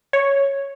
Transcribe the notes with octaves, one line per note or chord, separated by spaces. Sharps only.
C#5